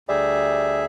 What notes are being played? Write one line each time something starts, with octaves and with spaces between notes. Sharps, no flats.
D2 G3 G#4 E5